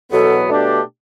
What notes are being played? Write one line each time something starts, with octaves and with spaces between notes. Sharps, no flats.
E2 B2 F#3 B3 A4
B2 A3 D4 G4